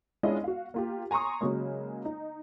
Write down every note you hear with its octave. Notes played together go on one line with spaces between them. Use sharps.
G#3 C#4 D4 E4 F4 D#5
F#4 F5
A#3 F4 G4
G#5 A#5 C6 C#6 D#6
C#3 F#3 G#3 A#3
D#4